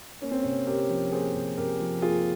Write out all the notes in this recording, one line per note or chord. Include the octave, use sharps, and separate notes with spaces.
A#3 C#4
C4
C3 C#4
C3 G4 A#4
F3
A#3 G#4 C5
C3
C3 G4 A#4
F3
A#3 F4 G#4